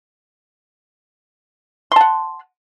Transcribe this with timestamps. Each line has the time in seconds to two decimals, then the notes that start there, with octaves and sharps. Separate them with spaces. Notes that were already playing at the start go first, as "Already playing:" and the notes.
1.92 C6
1.96 A5
2.01 F#5